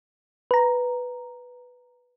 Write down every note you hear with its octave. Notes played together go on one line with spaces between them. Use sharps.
B4 A#5